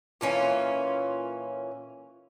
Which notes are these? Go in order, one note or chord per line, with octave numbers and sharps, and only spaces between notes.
A#2 E3 C#4 F4